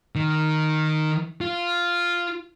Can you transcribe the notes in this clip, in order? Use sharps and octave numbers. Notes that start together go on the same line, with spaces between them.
D#3
F4